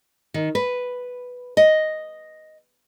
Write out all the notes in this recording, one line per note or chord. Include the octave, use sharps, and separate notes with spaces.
D#3
B4
D#5